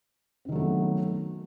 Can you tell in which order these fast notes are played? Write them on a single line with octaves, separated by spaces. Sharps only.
C4 D#3 F#3 A3 B3